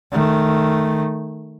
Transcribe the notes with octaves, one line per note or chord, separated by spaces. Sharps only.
D#3 A3